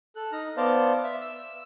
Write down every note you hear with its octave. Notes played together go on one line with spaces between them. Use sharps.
A4 F#6
D#4 A#5 F6
B3 C5 D5 F5 A5
E5
E6